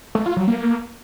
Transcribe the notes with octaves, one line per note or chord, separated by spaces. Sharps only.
A3
F4
F#3
A#3